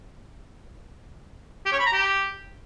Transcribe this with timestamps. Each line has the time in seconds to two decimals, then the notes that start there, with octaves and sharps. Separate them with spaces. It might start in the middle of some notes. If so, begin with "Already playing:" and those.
1.66 G4
1.72 C#5
1.79 B5
1.86 A#5
1.93 G4